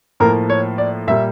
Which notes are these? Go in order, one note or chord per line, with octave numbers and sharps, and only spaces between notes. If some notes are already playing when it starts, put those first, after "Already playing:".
A2 F3 A#3 A#4
C#5
D5
A#2 G3 A#3 E5